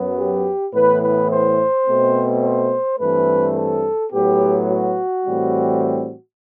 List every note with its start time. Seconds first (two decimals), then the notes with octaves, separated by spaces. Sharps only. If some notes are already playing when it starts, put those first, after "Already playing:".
Already playing: F#2 F#3 B3
0.18 G4
0.74 A2 E3 B3 B4
1.03 B4
1.31 C5
1.87 B2 A3 C4
2.43 C5
2.99 G2 E3 A3 C4 B4
3.55 A4
4.12 A2 F#3 B3 G4
4.68 F#4
5.24 A2 E3 G3 C4